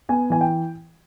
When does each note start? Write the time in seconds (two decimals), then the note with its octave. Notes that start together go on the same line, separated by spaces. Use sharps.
0.09 B3 G#5
0.30 E3 G#5
0.41 G5